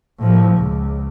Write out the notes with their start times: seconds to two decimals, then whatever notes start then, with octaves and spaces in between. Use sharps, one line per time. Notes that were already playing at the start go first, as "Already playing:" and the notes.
0.19 A2 F3
0.56 C#2